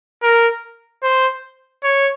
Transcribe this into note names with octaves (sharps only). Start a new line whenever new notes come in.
A#4
C5
C#5